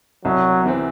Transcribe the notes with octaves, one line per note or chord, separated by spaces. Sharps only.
C2 F#3
C3 E3 C4